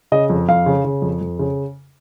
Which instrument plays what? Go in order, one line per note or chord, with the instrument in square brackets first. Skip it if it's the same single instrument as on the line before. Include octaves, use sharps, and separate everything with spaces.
[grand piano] C#3 D#5
F2
F2 F5
C#3
C#3
F2
F2
C#3